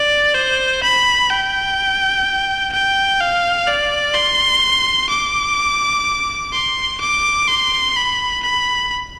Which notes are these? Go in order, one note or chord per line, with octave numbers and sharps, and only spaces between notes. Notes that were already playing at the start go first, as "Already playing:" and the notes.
Already playing: D5
C5
B5
G5
G5
F5
D5
C6
D6
C6
D6
C6
B5
B5